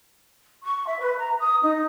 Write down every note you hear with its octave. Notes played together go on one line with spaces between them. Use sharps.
C#6
E5
B4
A#5
D#6
D#4